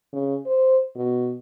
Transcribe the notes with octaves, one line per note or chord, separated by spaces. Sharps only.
C#3
C5
B2